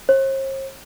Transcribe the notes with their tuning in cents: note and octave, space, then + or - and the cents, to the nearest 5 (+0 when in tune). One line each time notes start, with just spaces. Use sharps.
C5 +45